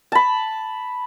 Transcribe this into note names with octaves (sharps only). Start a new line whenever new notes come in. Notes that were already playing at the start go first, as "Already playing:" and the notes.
A5 B5